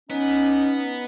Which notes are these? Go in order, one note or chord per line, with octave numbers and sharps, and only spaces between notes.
B3 C#4 D#4